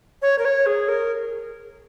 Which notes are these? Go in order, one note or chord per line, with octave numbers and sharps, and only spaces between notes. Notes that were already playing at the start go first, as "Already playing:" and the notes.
C#5
A#4
C#5
G#4
A#4